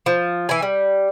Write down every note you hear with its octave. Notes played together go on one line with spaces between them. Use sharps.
F3
E3 G#5
G3